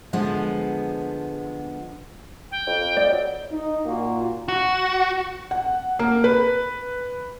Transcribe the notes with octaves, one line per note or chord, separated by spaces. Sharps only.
D3 F3 G#3 B3
G5
F2
D5 D#5
F#3
D#4
A#2 A#3 F4 F#4
F#4
F#5
A#3
B4